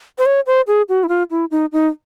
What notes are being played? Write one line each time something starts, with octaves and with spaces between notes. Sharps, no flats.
C5
C#5
C5
G#4
F#4
E4
F4
E4
D#4
D#4